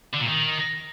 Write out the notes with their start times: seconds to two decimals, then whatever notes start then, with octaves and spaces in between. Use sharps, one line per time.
0.14 D3
0.21 A#2
0.29 D#3